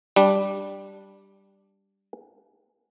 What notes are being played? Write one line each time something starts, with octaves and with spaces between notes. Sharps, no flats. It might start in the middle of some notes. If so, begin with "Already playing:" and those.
G3 D4